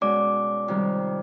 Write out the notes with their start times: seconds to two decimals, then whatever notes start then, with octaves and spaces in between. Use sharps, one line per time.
0.01 B2 G#3 C#4 D5 D6
0.68 F2 C3 D#3 G3